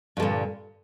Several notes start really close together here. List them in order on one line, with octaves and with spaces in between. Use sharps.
G2 D3 A#2